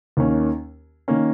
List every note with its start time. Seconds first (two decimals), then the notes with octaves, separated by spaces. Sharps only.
0.17 D#2 D#3 A#3 C#4
1.08 D#3 A#3 C#4